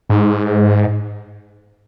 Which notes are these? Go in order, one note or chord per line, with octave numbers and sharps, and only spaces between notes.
G#2